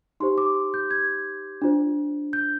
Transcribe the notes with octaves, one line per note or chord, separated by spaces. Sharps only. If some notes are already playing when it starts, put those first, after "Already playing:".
D#4 G4 C5 C6
D6
G6
G#6
D4 F4 C5
G6